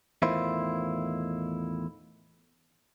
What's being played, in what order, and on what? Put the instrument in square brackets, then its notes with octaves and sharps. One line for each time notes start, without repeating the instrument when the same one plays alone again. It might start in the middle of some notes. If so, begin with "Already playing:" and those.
[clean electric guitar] E2 A2 D#3 E4 F4 C5